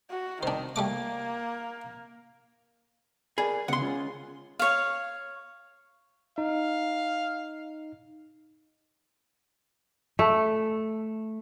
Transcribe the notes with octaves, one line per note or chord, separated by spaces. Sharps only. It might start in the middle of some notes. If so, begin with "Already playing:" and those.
F#4
D#3 D4 C5
G3 A3 A#3 D6
G#4 A#4 D5 B5
D2 C#3 B3 F#5 C6
C#4 F4 G#4
C#5 F5
D#4 F5
A3